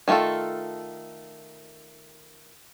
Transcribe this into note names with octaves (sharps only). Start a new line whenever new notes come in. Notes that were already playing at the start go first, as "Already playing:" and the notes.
D#3 A3 B3 F4 A4